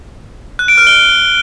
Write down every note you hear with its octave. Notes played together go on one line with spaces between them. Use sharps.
F#6
D7
F6
G7